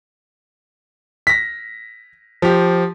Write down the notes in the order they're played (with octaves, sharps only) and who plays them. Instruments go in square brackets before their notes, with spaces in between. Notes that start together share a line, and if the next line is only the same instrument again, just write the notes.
[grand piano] A#6 B6
F3 G4